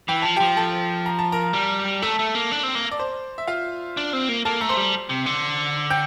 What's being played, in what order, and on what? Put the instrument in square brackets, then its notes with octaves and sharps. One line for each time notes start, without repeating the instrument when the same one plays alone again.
[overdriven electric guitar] E3 [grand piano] G5
[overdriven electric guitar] F3 [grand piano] A5
[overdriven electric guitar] F3 [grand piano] G4 G5
[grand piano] A4 A5
A#5
A5
A#4 A#5
[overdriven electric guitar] G3
[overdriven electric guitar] A3 [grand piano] A4 A5
[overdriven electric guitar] A3
A#3
D4
C4
A#3
[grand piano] D5
C5
E5
F4 F5
[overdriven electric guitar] D4
C4
A#3
[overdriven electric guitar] A#3 [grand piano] A4 A5
[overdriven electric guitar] A3 [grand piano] A#5
[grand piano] C5 C6
[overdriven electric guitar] G3
C3
D3
[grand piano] G5 G6